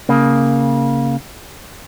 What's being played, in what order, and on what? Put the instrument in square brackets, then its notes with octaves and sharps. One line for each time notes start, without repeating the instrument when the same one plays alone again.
[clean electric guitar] C#3 A#3